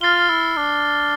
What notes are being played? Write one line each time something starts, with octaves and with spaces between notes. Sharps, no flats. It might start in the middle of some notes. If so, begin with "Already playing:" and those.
F4 F6 A6 C7 G7
E4
D4